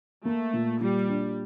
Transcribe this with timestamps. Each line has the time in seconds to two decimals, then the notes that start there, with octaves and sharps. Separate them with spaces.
0.25 A3 A#3
0.53 A#2
0.80 A#2 G3
1.09 D4